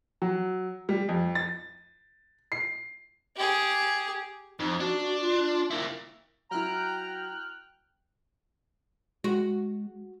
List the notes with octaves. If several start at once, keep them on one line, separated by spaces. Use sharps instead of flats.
F#3
G3
F2
A6
C7
G4 G#4
F2 D#4
D4 F#4
F#4
F4
A#3 E4
F#3 E4 G5 A#5 F6 F#6
G#3 F#4